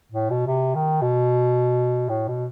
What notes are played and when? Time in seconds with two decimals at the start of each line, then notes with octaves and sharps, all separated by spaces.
0.12 A2
0.30 B2
0.47 C3
0.75 D#3
1.02 B2
2.09 A2
2.28 B2